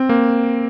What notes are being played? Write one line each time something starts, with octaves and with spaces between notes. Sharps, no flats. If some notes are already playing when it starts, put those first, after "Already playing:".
Already playing: C4
A#3